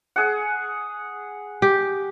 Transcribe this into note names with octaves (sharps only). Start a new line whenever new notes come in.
G#4 F#5
G4